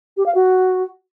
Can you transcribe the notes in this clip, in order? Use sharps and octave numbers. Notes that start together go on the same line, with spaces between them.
G4
F5
F#4